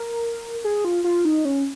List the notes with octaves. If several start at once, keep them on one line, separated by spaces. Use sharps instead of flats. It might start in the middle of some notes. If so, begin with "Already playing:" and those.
Already playing: A#4
G#4
F4
F4
D#4
C#4